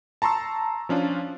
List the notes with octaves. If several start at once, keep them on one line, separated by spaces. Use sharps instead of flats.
A5 A#5 C6 C#6 E6
F3 C#4 D4 F4